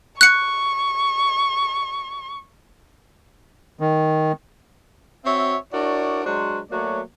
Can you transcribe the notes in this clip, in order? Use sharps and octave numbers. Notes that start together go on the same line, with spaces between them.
C#6 F#6 C#7
D#3
C4 F#4 C#5 E5
D4 E4 F#4 A#4 C#5 D5
F#3 G#3 D4 F#4 C5
F#3 A3 A#3 F#4 C#5 D5